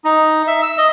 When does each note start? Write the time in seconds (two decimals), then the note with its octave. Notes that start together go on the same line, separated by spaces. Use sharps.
0.05 D#4
0.47 E5
0.63 E6
0.78 D#5